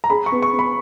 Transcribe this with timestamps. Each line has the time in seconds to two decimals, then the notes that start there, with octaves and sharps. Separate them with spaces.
0.04 A#5
0.10 G#4 B5
0.26 C#6
0.32 B3
0.42 C#6
0.53 B3
0.59 B5